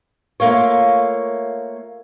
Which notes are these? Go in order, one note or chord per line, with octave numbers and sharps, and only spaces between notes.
A3 A#3 F4 C#5